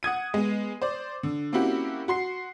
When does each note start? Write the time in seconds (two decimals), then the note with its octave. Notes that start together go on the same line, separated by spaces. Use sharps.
0.03 F#5 D#6 G#6 D#7
0.33 G#3 B3
0.82 C5 D5
1.23 D3
1.53 A#3 C4 C#4 E4 F#4 G4
2.08 F#4 C6 C7